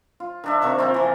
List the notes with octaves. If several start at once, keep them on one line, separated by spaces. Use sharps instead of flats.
F4
D#3 D4 E5
C3 D#3 A#3 C#6
C4 F4 A#4 C5
E3 F3